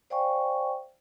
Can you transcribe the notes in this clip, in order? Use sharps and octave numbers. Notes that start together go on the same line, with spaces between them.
C5 D5 F5 G5 G#5 C#6